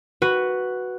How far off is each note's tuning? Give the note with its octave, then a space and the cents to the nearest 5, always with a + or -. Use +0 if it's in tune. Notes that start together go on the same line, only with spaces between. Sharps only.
F#4 +0 B4 +0